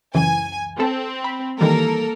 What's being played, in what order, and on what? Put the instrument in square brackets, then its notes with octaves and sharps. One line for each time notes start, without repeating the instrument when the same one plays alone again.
[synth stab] C#2 F#2 E3 [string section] G#5
[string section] C4 [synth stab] A4
[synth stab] B5
[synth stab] D#3 E3 G3 [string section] A#3 A4 A#4